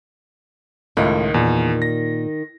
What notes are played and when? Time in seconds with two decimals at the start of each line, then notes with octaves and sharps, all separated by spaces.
0.97 C#2 A2 D#3 A3 F4 A5
1.34 E2 A#2
1.82 A#6